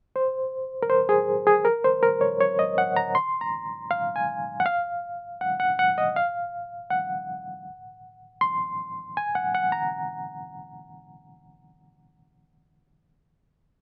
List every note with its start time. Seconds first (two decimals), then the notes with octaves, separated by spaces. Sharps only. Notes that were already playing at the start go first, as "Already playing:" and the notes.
0.16 C5
0.83 A#4
0.90 C5
1.09 G#4
1.47 G#4
1.65 A#4
1.84 C5
2.03 A#4
2.21 C#5
2.41 C#5
2.59 D#5
2.78 F#5
2.97 A#5
3.15 C6
3.41 A#5
3.91 F5
4.16 G#5
4.60 F#5
4.66 F5
5.41 F#5
5.60 F#5
5.79 F#5
5.98 D#5
6.16 F5
6.91 F#5
8.41 C6
9.17 G#5
9.35 F#5
9.55 F#5
9.72 A#5